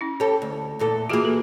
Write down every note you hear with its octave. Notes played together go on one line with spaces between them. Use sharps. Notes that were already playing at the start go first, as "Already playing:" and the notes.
C#4 E4
G4 A4 C#5
D2
E2 A#2 A4
E3 A#3 F4 F#4 G#4
A4